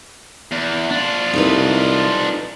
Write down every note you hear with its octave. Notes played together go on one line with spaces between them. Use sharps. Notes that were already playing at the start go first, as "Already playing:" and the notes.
E2
D4 F4
C2 D#4 A4 B4